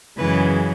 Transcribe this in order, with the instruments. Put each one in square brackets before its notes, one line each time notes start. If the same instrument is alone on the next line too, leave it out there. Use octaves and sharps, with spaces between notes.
[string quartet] F#2 C#3 E3 G#3 B4